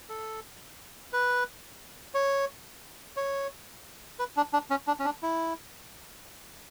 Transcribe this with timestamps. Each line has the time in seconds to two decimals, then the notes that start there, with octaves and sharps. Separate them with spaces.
0.09 A4
1.13 B4
2.14 C#5
3.17 C#5
4.19 B4
4.37 D4
4.53 D4
4.70 C#4
4.87 D4
4.99 C#4
5.05 D4
5.23 E4